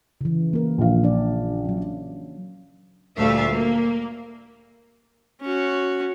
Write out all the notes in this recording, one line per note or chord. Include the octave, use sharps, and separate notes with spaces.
C#3 E3
A#3 A#4
A#1 F5
D4 D5
F#3 C#4
D2 A#2 G3 A3 E5 F5
A#3
C#4 F#4